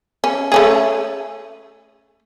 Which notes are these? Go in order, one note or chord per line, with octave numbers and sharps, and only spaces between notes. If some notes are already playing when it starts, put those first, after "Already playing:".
C#4
A3 C#4 G#4